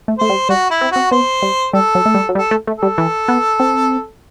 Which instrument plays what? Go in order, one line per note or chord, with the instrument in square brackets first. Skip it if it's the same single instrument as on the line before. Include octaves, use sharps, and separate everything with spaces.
[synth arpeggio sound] A3
[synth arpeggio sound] A3 [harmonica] C5
[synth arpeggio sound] G3
[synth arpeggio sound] G3 [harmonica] F#4
[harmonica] E4
[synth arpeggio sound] C4
[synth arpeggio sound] C4 [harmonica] F#4
[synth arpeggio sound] B3 [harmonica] C5
[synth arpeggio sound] G3
[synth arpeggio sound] G3 [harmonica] A4
[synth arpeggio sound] F#3
A3
G3
F#3
[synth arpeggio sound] G3 [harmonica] A4
[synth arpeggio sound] A3
A3
[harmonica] A4
[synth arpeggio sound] G3
E3
B3
C4